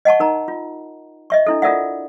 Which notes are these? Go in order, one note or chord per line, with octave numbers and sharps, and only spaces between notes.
D#5 F#5 A5 C#6
D#4 A#4 A#5
F4
D#5 E5 C#6
D4 E4 A4
F4 A4 A#4 D5 E5 F#5